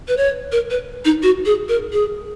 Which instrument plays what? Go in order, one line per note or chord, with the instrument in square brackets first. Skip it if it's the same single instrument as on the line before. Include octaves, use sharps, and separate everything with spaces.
[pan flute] B4
C#5
A#4
B4
D#4
F#4
G#4
A#4
G#4